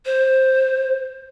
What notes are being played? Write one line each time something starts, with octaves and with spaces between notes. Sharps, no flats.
C5